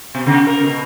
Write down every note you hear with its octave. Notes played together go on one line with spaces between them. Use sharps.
B2
C#3
A#4
B2